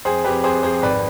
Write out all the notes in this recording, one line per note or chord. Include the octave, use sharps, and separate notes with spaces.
F2 G#4 C5
F2 G4 B4
F2 G#4 C5
F2 G#4 C5
G#1 B4 D5